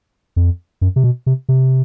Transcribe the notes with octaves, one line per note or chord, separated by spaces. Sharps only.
F2
F#2
C3
B2
C3
C3